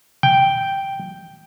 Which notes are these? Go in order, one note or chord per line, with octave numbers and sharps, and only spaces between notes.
G5